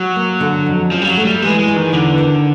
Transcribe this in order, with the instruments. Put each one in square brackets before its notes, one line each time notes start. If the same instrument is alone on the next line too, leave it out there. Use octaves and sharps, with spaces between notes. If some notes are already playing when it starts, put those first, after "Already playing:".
Already playing: [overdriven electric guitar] F#3
[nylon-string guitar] A#3
D3
F2
[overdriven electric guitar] F3 [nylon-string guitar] C#4
[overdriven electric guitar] G3
F#3
[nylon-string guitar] A3
[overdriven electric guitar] G3
[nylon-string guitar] E3 [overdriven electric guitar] G#3
[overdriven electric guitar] G#3
[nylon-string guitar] E3
[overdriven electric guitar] D#3
[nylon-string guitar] E2 [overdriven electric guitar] D3
[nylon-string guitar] D#3